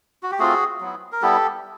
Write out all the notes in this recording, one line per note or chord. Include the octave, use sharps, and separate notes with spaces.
F#4
G4
A3 C4 F4 F#4 G#4
F#3 B3 E4
A#4
G3 B3 E4 G4 A4